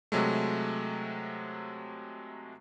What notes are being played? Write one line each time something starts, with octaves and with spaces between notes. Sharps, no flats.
C3 F#3 G#3 A3